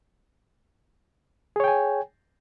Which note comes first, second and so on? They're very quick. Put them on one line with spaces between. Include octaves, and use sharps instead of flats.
G#4 C#5 G5 G#5